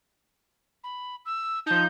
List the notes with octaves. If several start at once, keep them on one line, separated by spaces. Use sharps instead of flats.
B5
E6
F3 D#4 A5 G6